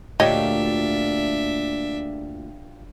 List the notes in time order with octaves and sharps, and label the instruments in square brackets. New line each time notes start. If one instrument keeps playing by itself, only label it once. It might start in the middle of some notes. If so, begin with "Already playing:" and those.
[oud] D2 A#2 [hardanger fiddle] D4 E5 [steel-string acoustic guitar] F4 G4 [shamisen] C#5 D#5